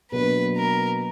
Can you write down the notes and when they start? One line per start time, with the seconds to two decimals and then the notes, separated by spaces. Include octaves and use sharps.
0.11 B2 F#3 A#3 D4 B4
0.57 A#4